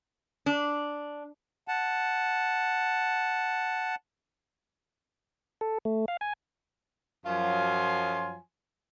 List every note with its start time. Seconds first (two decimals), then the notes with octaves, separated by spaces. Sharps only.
0.46 D4
1.68 F#5 A5
5.61 A4
5.85 A3
6.08 F5
6.21 G#5
7.26 F#2 F3 F#3 F4 G#5 C6